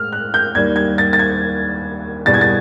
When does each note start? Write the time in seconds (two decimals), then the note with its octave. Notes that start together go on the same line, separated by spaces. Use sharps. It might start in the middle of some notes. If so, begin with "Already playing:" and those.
Already playing: A2 G#3 F6
0.12 F#6
0.34 G6
0.54 D#2 D#3 G3 G#6
0.76 G#6
0.98 A6
1.13 A6
1.19 G#6
2.26 E2 B2 G3 A6
2.34 G#6
2.41 A6